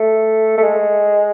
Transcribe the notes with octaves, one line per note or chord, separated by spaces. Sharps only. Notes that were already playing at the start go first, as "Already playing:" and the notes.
Already playing: A3
A3
G#3